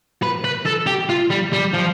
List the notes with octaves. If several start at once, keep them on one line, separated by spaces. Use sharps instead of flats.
B4
B4
A4
G4
F4
G3
G3
F3